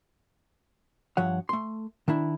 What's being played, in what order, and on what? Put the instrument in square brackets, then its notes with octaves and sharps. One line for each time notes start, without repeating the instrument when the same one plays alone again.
[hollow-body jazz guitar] G2 F3 C#5 F#5
A3 C6
D#3 D4 E4